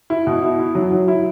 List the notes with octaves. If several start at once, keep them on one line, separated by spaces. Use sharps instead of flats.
E4
B2
E4
E4
F#3
F#3
E4